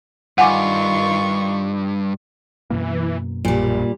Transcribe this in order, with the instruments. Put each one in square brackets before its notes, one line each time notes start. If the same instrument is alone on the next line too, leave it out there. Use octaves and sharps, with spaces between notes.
[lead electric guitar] G2 [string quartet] D#3 F4 C#6 [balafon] F#5 G#5 D6
[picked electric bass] F#2 B2 A#3 [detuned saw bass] E3
[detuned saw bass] A#1 [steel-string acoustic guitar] A#2 G3